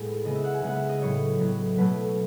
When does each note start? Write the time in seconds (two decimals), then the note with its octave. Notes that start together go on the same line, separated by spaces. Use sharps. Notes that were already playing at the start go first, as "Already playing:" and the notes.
Already playing: A2 G#3 B3
0.25 C#3 G#3 B3 D#5
0.35 E5
0.44 F#5
0.54 G#5
0.62 C#3 G#3 B3 F#5
0.76 E5
0.89 D#5
1.01 A2 F#3 B3 C#5
1.40 A2 F#3 B3
1.77 B2 F#3 A3 B4